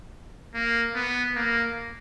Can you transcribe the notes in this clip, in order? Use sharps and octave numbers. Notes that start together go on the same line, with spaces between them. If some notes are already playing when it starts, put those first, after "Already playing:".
A#3
B3
A#3